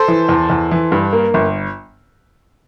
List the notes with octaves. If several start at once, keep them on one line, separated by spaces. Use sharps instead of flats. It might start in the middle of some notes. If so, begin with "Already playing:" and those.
Already playing: A4 C5
E3
E2
E2
E3
G2
A#3
G1